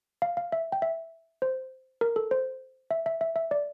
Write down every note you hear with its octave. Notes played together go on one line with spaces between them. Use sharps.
F5
F5
E5
G5
E5
C5
A#4
A4
C5
E5
E5
E5
E5
D5